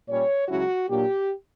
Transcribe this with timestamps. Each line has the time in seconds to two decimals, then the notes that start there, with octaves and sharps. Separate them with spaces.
0.08 A#2 G3 C#4 C#5
0.48 C#2 C#3 F#3 C#4 E4 F#4
0.89 A#2 F#3 A#3 D4 G4